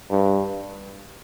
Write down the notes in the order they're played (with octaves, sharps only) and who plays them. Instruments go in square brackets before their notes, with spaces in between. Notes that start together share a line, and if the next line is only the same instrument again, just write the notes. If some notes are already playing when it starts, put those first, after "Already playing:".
[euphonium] G2